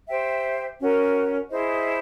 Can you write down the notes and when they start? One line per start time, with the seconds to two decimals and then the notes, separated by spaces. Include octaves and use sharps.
0.08 G4 C5 E5 G5
0.79 C#4 F#4 A#4
1.50 E4 G#4 C5 D#5